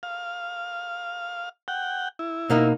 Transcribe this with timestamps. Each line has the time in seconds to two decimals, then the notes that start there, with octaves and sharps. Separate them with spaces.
0.03 F5
1.68 F#5 G5
2.19 E4
2.50 B2 A#3 D#4